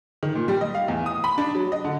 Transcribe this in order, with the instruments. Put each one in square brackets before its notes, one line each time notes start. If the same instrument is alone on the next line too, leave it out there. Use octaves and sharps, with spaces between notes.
[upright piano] D#3
A#2
G3
D#5
F5
E2
D#6
B5
D4
F#3
D#5
D3